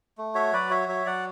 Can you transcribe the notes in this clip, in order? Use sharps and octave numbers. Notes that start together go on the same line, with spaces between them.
A3
F#4 C#5 E5
F#3 B4 D5
F#4 C#5 E5
F#3 C#5 E5
F#3 D5 F#5